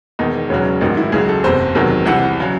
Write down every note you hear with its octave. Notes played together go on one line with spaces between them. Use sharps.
E1 E2 D#3 D#4
E1 E2 C#3 F#3 C#4
A1 G#2 D#3 F#3 D#4
E4
C#2 C#3 F#3 G#4
A4
F#1 E2 C3 C5
E1 E2 C3 D#3 F#3
C2 C3 E3 F#5
C#3 F#3